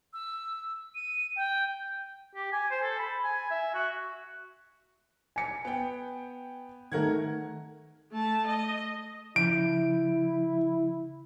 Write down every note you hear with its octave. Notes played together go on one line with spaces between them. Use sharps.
E6
D#7
G5
G4
G#5
C5
A4
B5
G#5
E5
F#4
G#5 C#7
B3 G5
D#3 A3 A#4 F#5 G#6
A3 A5
D#5
C#3 F3 E4 G6 D7